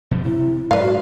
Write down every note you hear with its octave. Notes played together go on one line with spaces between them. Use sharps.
B2 F3 G3
C3 E4
G#2 F#3 B4 D5 F5
F#4